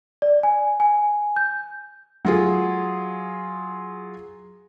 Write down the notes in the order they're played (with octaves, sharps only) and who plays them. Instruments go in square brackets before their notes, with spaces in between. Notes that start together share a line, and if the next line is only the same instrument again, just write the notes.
[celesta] D5
G#5
G#5
G6
[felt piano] F#3 F4 G#4